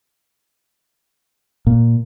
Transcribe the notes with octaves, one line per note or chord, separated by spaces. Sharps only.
A#2